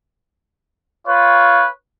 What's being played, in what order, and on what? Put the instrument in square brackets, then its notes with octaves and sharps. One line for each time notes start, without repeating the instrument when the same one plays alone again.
[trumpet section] F4 B4 C#5